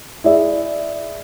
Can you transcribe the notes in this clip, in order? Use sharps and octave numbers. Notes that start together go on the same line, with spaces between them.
E4 G#4 D5 E5